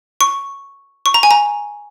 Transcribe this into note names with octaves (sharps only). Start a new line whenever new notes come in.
C#6
C#6
A#5
G#5
A#5